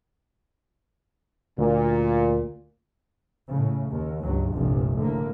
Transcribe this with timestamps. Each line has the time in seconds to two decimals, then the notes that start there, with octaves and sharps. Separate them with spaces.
1.58 D2 A#2
3.49 A2 C#3
3.89 D#2
4.23 C#2 G2 F#3
4.53 F1 C2 G2 A#2
4.97 A2 D3 A#3